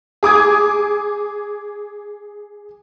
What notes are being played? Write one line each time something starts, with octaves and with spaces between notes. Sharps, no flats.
G#4 D6 D#6 G#6